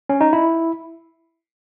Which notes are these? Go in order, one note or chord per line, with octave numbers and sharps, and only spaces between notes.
C#4
D#4
E4